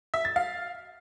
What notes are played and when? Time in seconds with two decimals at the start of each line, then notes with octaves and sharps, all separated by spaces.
0.14 E5
0.25 A6
0.36 F5